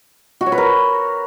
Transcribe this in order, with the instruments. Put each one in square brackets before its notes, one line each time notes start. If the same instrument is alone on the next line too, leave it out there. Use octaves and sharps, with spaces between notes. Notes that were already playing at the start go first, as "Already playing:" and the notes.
[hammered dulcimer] F#4
C#5
B4
A#4